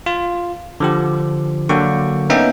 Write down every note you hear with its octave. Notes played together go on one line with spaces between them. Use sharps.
F4
D3 F3 G4
D3 F#3 A#3 G5 C#6
A#3 B3 C#4 D#4 E5 G5